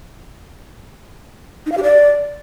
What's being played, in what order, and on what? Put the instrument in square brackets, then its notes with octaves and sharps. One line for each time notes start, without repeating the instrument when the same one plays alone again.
[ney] D#4
F5
G4
D5